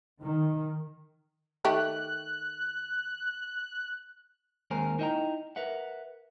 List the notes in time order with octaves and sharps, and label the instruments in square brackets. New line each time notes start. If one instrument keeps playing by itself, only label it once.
[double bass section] D#3
[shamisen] D#3 A3 G4 [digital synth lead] F#6
[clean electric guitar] D#2 G#3 C4 A#4 C5 G#5
D#4 E4 D#5 F5 G5 A#5
A#4 B4 E5 F#5